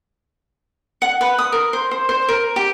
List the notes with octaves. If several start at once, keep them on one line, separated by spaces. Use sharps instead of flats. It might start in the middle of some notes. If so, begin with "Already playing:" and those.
F#5
B4
D#6
A#4
C5
C5
C5
A#4
G4